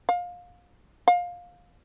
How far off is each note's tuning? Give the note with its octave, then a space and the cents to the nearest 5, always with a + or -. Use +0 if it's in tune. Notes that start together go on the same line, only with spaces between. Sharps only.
F5 +25
F5 +20